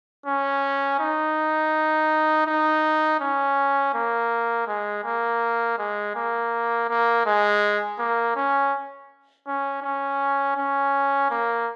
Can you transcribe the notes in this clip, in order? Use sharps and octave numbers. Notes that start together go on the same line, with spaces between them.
C#4
D#4
D#4
C#4
A#3
G#3
A#3
G#3
A#3
A#3
G#3
A#3
C#4
C#4
C#4
C#4
A#3